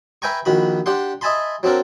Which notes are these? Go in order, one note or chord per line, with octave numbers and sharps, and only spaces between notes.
B4 E5 G5 G#5 A#5 C#6
A#1 D#3 F#4 B5
D4 G4 F#5 C6
D#5 E5 G#5 A5 B5 C6
F#3 C4 D4 A4 A#4